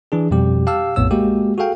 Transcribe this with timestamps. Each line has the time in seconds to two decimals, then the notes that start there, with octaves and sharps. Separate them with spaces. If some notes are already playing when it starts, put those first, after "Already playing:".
0.12 E3 D4 G#4
0.31 F2 B2 G3 G4
0.67 G4 F5 A5 E6
0.96 A#1 F2 A2 B3 C#5 E6
1.11 G#3 A#3 F#4 G4
1.58 F#4 G#4 A4 F5 G5